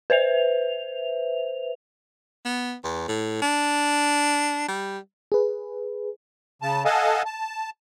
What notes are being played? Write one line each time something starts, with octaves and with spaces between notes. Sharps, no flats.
B4 C5 E5 F7
B3
E2
A2
D4
G3
G#4 B4
C#3 A5
A4 D#5 F5 F#5 G#5 A5
A5